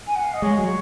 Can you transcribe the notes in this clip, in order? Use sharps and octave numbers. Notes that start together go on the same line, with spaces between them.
G#5
F#5
F5
D#5
G#3 C#5
F#3